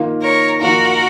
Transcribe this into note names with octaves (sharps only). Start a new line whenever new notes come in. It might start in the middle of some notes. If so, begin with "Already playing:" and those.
Already playing: D#3 A#3 F4
A#4 C#5
D#3 A#3 F4 F#4 A#4